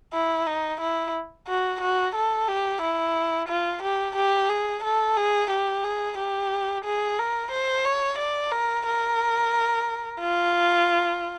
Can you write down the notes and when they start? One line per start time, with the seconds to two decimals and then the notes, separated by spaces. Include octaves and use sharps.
0.13 E4
0.47 D#4
0.81 E4
1.48 F#4
1.81 F#4
2.15 A4
2.48 G4
2.82 E4
3.49 F4
3.83 G4
4.16 G4
4.49 G#4
4.84 A4
5.17 G#4
5.51 G4
5.84 G#4
6.18 G4
6.85 G#4
7.19 A#4
7.51 C5
7.85 C#5
8.18 D5
8.52 A#4
8.86 A#4
10.20 F4